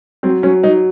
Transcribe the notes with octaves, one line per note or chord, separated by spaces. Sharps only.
F#3 C4
F#3 C#4
F#3 D#4